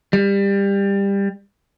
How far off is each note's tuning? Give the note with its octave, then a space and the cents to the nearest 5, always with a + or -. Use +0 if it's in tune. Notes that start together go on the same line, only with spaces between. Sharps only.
G3 +20